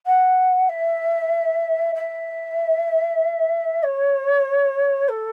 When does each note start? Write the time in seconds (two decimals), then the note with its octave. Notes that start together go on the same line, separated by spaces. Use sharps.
0.06 F#5
0.69 E5
1.95 E5
3.83 C#5
5.09 A4